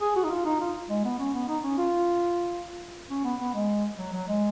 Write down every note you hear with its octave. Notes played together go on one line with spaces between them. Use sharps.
G#4
F#4
D#4
F4
D#4
F4
G#3
B3
C#4
B3
D#4
C#4
F4
C#4
B3
B3
G#3
F#3
F#3
G#3